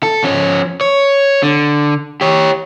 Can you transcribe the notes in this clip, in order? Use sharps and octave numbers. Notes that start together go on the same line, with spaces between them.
A4
F3 C#4
C#5
D3
G4 C#5